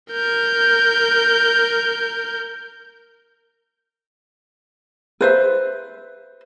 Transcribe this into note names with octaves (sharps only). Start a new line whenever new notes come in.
A#4 G6
B4 C5 E5